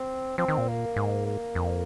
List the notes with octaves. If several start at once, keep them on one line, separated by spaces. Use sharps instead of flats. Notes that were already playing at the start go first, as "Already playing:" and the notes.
Already playing: C4
F3 C4
D#3
A#2
A#3
G#2
A#3
F2